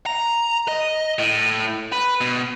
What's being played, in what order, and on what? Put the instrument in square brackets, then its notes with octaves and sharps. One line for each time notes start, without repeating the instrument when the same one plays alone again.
[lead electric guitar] A#5
D#5
A2
B4
B2